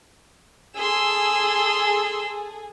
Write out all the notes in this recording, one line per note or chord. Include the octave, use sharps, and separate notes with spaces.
G#4 A4 C6 E6